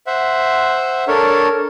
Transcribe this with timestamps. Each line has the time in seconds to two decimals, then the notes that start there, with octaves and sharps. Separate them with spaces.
0.07 C5 E5 F#5
1.08 D4 A4 A#4 C#5